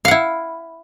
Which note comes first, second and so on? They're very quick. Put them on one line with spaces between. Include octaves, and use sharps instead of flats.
F5 F#5 E4